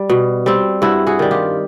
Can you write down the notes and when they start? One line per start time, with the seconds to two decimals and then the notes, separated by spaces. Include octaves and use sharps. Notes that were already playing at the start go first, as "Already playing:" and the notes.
Already playing: G3
0.10 B2
0.46 G3 C4
0.82 G2 E4 F#4
1.07 F#4 G#4
1.19 D#3 G3
1.31 F4 G4